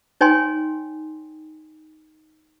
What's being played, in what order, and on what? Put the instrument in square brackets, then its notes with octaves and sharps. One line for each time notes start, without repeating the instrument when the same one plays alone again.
[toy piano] D#4 C#5 G5 G#5 C6